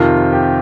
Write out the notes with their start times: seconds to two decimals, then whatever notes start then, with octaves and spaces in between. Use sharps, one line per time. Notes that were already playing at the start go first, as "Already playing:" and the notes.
Already playing: F2 C3 D#3 F4
0.33 G4